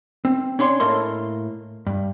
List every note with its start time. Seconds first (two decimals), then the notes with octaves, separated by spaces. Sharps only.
0.25 C4
0.59 C#4 D4 C#5 C6
0.80 A2 A3 A#3 D#5 C6
1.87 G2